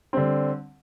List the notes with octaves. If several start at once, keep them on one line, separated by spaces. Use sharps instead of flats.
D3 G3 C4